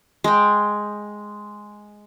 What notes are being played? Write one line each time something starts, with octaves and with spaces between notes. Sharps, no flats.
G#3 G5